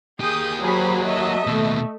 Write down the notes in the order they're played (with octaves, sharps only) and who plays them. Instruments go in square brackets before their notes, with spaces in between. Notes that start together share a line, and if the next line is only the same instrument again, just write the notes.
[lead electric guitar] A#3 G4 [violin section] G#4 D#6 G6
[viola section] F#3 [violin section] G#4 C5 B5
[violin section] A4 D#5 E5
[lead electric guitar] D#2 B2 [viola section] A3